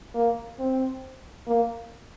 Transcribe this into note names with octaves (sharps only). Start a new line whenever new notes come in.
A#3
C4
A#3